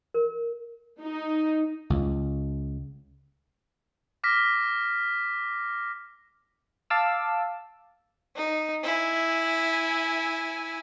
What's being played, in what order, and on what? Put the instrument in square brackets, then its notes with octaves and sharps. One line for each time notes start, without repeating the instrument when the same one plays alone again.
[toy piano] A#4
[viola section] D#4
[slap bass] C#2
[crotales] D6 F6 A#6 B6
[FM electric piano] F5 A5 D6 E6
[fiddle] D#4
E4 G#5